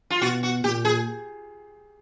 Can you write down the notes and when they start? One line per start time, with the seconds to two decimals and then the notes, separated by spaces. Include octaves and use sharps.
0.10 F4
0.21 B2 F#4
0.43 F#4
0.64 A#2 G4
0.85 G#4